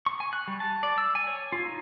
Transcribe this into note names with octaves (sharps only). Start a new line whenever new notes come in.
C#6
G#5
F#6
G3
A5
D5
E6
G#5
C#5
F4
D#4